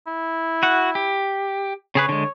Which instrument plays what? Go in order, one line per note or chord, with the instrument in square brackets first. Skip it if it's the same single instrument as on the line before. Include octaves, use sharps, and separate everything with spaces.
[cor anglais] E4
[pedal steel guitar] F#4 F#5
G4
[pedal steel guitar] C#3 G#4 B4 [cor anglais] C#5
[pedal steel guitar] D3 G#3